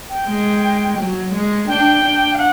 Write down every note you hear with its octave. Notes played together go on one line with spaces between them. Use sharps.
G5
G#3
F#3
G#3
D4 G5
D4
F5
F#5